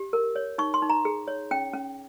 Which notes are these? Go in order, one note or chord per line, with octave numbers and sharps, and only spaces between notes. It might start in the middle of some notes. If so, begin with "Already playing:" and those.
Already playing: G4
A#4
C#5
D#4 C#6
C6
D#4
A#5
G#4
C#5
C#4 G5
C#4